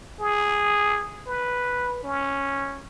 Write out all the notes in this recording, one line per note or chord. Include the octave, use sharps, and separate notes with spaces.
G#4
B4
C#4